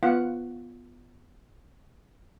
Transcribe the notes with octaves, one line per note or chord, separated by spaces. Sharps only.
B3 F4 F#5